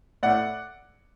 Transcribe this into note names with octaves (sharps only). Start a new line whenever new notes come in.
A2 A3 E4 D5 F#5